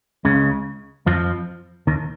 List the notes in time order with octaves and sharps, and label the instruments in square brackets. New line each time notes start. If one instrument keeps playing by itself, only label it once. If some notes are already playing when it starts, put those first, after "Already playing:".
[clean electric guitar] C#2 C#3
F2 F3
D#2 D#3